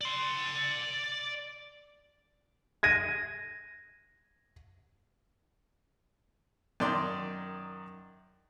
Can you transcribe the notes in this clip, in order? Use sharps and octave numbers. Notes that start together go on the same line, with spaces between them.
D5 C6
G#6 A#6 D#7
F#2 D#3 D5 C6